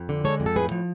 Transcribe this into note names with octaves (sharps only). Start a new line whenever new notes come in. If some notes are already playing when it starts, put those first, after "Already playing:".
Already playing: F2
D3
G#3 A4 C#5
F2
A4
A2 G#4 B4
F3